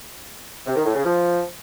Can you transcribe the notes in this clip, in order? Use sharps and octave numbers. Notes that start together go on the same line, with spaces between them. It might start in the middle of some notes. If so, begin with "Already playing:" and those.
C3
D#3
A2
C#3
F3